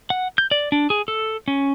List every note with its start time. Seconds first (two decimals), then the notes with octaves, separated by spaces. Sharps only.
0.10 F#5
0.38 G6
0.51 D5
0.72 D4
0.90 G#4
1.08 A4
1.48 C#4